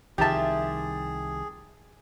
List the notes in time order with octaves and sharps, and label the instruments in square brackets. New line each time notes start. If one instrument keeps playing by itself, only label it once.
[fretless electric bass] C2 D#3 F3 [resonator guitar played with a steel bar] F4 E5 [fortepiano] G4 A5 [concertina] G#4